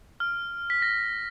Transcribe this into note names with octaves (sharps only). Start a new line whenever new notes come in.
F6
B6
A#6